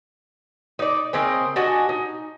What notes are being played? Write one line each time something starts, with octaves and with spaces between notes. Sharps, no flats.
D#4 D5
C#3 C4 A#4 D#5
D4 F#4 D#5 G#5
D#4